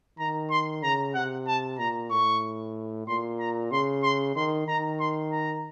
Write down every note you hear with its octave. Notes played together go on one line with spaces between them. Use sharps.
D#3 A#5
C6
C#3 A#5
C3 F#5
A5
A#2 A#5
A2 C#6
A#2 C6
A#5
C#3 C6
C6
D#3 C6
D#3 A#5
C6
A#5